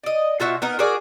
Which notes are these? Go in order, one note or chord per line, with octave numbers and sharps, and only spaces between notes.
D5 D#5
B2 F4 F#4 E5
B3 D#4 A#4
F#4 G#4 A#4 D5